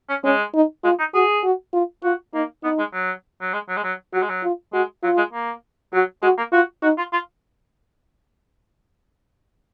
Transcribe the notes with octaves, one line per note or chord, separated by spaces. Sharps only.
C#4
G#3 C#4
D#4
G#3 F4
D#4
F#4 G#4
F#4
F4
F4 F#4
A#3 D#4
B3 D#4
G#3
F#3
F#3
G#3
F#3
G#3
F#3
F#3 F#4
G#3
F#3
F4
G#3 F#4
F#3 F4
G#3
A#3
F#3 F#4
G#3 F#4
A#3
F4 F#4
D#4 F#4
F4
F4